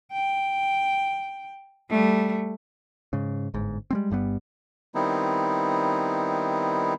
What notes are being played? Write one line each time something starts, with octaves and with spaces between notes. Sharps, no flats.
G5
G3 A3
G#2 C#3
G1 G#2
G3 G#3 C4
G1 G2 G3 B3
D#3 G3 B3 C4 D#4 E4